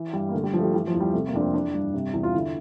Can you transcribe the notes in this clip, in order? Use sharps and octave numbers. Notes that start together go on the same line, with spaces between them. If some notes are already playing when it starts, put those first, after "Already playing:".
Already playing: E3
G2 G3
A#3
D3 A3
G3
G2 F3
A3
G3
E3 G3
F3
E2
G3
C3 A3
A#3
F2 D4
C4
E3 D4
G2
C3
E2
F4
D3 E4